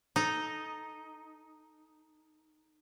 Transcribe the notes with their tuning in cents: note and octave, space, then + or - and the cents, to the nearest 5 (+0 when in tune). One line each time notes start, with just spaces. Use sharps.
D#4 +0 A4 -5 A#5 +0